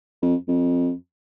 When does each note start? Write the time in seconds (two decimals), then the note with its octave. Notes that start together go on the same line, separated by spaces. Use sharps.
0.22 F2
0.48 F2